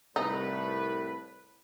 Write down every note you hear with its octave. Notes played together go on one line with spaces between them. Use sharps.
C2 A2 D#4 B4